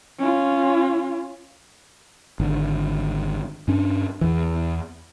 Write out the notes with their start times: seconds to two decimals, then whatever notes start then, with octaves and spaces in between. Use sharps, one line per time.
0.19 C#4 F4
2.40 G#1 D3
3.68 G2 C#4 D4
4.21 E2 E3